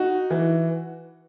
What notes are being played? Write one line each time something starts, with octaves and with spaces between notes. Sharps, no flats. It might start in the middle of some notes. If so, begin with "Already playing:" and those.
Already playing: D#4 F#4
E3